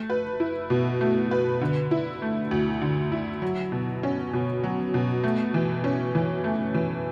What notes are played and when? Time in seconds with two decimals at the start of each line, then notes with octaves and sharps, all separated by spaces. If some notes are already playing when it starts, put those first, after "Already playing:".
Already playing: A3
0.10 B4
0.40 E4
0.70 B2
1.01 A3
1.31 B4
1.61 D3
1.91 E4
2.22 A3
2.51 D2
2.81 D3
3.12 E4
3.42 F#3
3.72 B2
4.03 C#4
4.33 B2
4.64 F#3
4.94 B2
5.23 A3
5.54 E3
5.84 C#4
6.15 E3
6.44 A3
6.74 E3